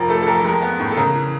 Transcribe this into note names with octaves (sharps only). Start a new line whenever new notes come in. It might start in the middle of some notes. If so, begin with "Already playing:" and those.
Already playing: F1 F3 A#4
A3 A4
A4
F2 A#4
G#3 A#4
B3
A2
A4
C#3 A#4
E3